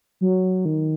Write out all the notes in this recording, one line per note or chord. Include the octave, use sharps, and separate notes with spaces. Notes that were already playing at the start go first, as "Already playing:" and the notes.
F#3
D#3